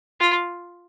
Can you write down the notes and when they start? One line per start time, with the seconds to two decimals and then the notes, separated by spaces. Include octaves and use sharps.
0.20 F4